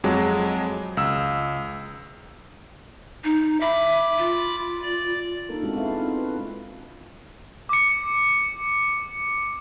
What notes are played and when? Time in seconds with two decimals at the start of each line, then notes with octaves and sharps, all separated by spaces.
0.04 F2 F#3 G#3
0.97 C#2 E6
3.24 D#4
3.61 E5 B5 D6
4.18 F4
4.82 D5
5.49 A#3 D4 D#4 A4 A#4
5.63 G#3 B3 C4 D4 E4 F#4
5.77 E4 F4 A4 B4 E5 F5
5.99 C4 D4 D#4 F4
6.17 B4
7.69 D6 C#7